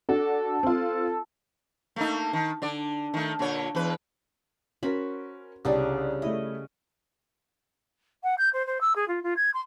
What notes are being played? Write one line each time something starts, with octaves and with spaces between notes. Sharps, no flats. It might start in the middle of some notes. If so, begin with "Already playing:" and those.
D4 F#4 A4
C4 F4
A3 A#3 D#4
D#3
D3 D5
D#3 A3
A#2 D3 C#5
E2 B4
C#4 F#4 A#4 C5 B5
C2 C#3 G3 D4
A3 E4 D#5
F#5
G6
C5
C5
E6
G#4
F4
F4
G#6
C6